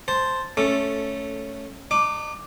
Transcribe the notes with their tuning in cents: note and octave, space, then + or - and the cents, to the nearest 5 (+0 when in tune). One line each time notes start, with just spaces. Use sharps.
C5 +0 A5 +0
A3 -5 C#4 +0 A4 +5
D#4 -45 D6 +0